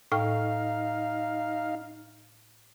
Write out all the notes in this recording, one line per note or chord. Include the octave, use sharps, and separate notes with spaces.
A2 D#4 F5 G5 F6